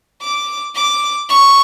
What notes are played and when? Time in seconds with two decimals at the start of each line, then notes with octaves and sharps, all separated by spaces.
0.21 D6
0.75 D6
1.29 C#6